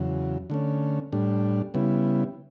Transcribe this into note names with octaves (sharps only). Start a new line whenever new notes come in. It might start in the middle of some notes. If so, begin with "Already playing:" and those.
Already playing: E2 C#3 F#3
D3 A3 C#4
A2 G3 D4
C#3 G3 B3 E4